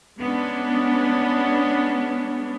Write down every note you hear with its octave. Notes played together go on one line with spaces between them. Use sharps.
G#3 B3 C#4 D4